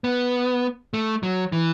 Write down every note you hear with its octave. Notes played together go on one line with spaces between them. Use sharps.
B3
A3
F#3
E3